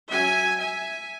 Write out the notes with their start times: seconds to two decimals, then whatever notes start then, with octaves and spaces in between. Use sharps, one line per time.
0.11 F#3 C#4 E5 G#5
0.60 E5 G#5